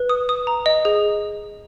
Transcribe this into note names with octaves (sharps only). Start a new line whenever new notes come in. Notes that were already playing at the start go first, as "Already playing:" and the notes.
Already playing: B4
D#6
D#6
A#5
D#5
G#4